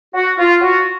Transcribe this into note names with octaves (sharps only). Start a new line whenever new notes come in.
F#4
F4
F#4